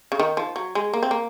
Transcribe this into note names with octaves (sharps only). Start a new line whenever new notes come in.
C#3
D#3
F3
F#3
G#3
A#3
C4
A#3